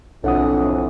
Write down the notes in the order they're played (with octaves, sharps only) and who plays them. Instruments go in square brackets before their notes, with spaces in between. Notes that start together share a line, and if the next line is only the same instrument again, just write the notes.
[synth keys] B1 F#5 D#6 [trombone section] F2 E3 [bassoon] A2 [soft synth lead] D4